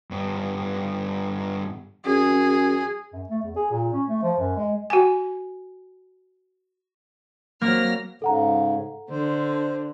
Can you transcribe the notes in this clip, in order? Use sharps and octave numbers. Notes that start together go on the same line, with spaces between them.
G2 B3
F#2 G#4
F#2
A3
E2
G#4
A#2
C#4
A3
F3
F#2
G#3
F#4 G#5
F#3 A#3 F6 A#6
G#2 C#3 A4 F#5 A#5
D3 C5